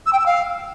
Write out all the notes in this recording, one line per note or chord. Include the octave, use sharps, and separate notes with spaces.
E6
G5
E6
F5